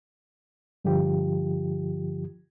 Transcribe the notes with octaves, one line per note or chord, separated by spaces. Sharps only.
G2 D3 F3 F4 G4